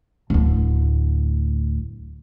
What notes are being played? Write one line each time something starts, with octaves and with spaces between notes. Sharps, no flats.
D1 D2